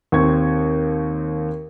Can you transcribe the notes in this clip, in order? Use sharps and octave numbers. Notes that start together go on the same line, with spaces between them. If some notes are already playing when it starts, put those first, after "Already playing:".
D#2 C4 C#6 G#6